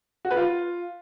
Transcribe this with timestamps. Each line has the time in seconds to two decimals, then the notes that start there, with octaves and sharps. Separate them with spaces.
0.25 F#4
0.31 B4
0.37 F4